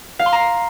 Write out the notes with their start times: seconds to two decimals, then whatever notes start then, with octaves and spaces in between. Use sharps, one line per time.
0.19 F5
0.26 C6
0.33 A#5